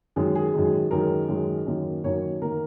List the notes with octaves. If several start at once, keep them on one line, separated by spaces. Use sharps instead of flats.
F#2 D#3 G#3 G#4
G#4
F#2 D#3 G#3
F#2 D#3 G#3 A#4
F#2 D#3 G#3
F#2 D#3 A#3
F#2 D#3 A#3 C#5
D#3 A#3 A#4